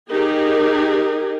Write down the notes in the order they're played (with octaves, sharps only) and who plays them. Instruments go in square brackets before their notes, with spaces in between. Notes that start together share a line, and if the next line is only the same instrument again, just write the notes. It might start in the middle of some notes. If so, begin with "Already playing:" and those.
[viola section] D#4 G4 G#4 A#4